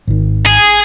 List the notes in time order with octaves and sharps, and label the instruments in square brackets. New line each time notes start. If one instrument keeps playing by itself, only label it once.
[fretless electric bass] G#1 D#3
[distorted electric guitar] G#4